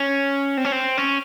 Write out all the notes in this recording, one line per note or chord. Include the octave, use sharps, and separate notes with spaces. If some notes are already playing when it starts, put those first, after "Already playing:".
Already playing: C#4
C4
C#4
C4
C#4